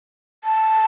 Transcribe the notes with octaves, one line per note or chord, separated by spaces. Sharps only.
A5